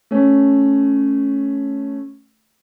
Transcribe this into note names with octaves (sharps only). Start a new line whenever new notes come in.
A3 C#4